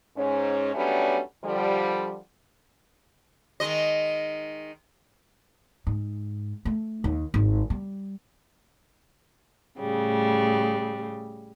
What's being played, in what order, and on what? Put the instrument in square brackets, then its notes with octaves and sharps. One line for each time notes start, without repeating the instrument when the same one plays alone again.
[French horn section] G#2 C#4
F#3 G3 A3 B3 C#4 D4
D3 F3 G3
[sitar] D#3 G#3 D#5
[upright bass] G#2
A3
D#2
G#1
G3
[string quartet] A2 C#3 G3